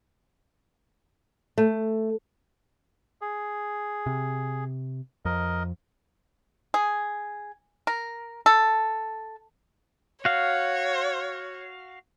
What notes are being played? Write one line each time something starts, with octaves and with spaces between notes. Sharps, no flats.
A3
G#4
C3
F2 A#4 D#5
G#4
A#4
A4
F#4 C#5 F5